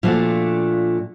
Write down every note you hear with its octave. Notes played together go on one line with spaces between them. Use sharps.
A#2 F3 A3 D4 F#4